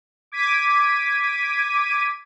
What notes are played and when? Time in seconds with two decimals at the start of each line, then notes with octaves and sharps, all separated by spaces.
0.32 D6 G#6 B6 D#7